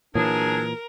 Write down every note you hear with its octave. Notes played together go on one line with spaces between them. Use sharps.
A#2 E3 F#3 D4 G#4 A#4